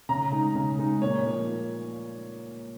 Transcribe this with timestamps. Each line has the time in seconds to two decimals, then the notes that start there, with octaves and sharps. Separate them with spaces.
0.09 C#3 A#5
0.32 G#3 D#4
0.55 C#3
0.79 G#3 D#4
1.02 A#2 C#5
1.26 F3 A#3